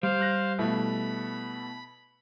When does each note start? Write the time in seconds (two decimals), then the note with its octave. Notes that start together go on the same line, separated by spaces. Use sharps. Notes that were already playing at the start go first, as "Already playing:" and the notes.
0.03 G3 C5 F5
0.21 F#6 A#6
0.59 B2 A3 E4 B5